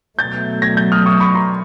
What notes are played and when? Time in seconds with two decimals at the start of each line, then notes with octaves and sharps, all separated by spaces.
0.19 B2 F#3 A3 G6 A6
0.62 G#6 A#6
0.77 G6 A6
0.92 D#6 F6
1.06 C#6 D#6
1.20 B5 C#6
1.35 A#5 C6